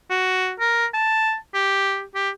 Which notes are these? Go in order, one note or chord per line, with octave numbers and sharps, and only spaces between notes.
F#4
A#4
A5
G4
G4